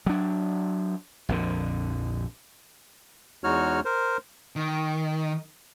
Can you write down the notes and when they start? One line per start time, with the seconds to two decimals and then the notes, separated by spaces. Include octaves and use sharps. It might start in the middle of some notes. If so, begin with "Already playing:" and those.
0.06 F#3 D4
1.29 A#1 F2 D3
3.44 E2 G#3 D#4 F#4 C#5 F6
3.85 A#4 C5
4.56 D#3